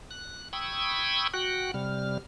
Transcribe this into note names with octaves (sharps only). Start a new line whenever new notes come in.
F#6
G5 B5 C#6 D#6 E6 G#6
F#4 F#5 G5 F#6
C3 G3 F6